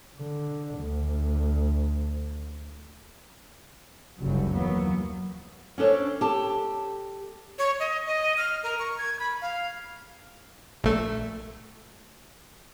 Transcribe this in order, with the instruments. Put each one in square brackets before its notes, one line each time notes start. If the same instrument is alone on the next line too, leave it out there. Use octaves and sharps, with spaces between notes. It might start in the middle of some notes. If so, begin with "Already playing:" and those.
[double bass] D3
D2
[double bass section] F#1 C#2 D3 F#3 G3
D#2 E3 F#3 A#3 B3
[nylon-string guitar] C#4 D4 A4 C5 C#5
G4 A4 A5
[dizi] C#5
D#5
D#5
F6
A#4
C#6
G#6
B5
F5
[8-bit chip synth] A#1 A3